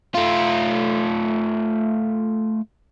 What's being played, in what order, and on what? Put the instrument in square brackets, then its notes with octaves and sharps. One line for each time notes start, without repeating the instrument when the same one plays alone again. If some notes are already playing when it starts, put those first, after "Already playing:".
[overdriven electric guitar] A3 F4